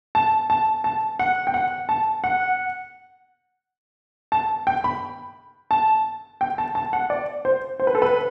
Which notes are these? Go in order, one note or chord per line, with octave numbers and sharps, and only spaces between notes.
A5
A5
A5
F#5
G5
F#5
A5
F#5
A5
G5
B5
A5
G5
A5
A5
F#5
D5
C5
C5
B4
A4
B4